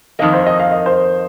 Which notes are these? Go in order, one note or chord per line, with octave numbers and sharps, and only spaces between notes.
F2 D#3 A#3 D#5
C5
D#5
F5
D#5
C5